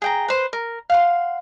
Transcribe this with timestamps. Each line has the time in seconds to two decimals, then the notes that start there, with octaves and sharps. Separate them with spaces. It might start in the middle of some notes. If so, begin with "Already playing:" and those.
0.02 G#4 G5 A#5
0.28 B4 C5
0.53 A#4
0.90 F5 F#5 C6